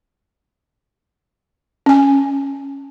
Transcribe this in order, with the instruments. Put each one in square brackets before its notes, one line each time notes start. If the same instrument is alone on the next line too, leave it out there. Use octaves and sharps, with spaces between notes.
[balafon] C#4 G#5